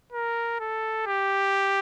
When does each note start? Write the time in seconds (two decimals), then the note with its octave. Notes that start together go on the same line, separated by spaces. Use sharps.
0.12 A#4
0.60 A4
1.07 G4